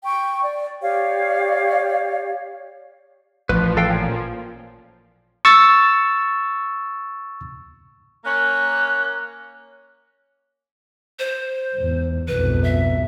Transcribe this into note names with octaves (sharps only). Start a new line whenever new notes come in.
G5 C#6
D5
G4 C#5 D5 F5
A1 F3 B4
A4 F5 G5
A#2 C#4
C#6 E6 A6
A#3 C#4 F#6
C5
E2 G#2
B1 F2 G#2 B4
E5